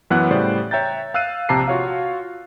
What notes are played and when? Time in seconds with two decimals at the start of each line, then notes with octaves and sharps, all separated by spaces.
0.10 F#2 E3 B3 F#5 F#6
0.31 A2 C#3 G3 C5 D5
0.71 C#5 E5 G5 A#5 G6 A6
1.14 F5 E6 F#6 C7 D#7
1.49 A#1 C3 A5 A#5 D6 C7
1.68 F4 F#4 C#5 F5